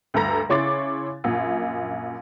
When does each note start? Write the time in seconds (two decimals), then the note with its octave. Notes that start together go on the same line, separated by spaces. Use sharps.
0.14 D2 G2 A4 A#5 A#6
0.49 C#3 E4 C#5 C6 D6 A6
1.24 A#1 F#2